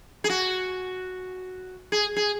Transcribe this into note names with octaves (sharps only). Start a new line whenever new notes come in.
G#4
F#4
G#4
G#4